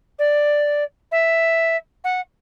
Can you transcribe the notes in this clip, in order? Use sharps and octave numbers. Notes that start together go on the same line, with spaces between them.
D5
E5
F#5